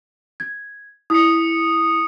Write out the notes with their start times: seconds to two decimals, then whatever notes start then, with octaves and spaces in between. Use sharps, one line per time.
0.40 G#6
1.10 E4 D#6 C#7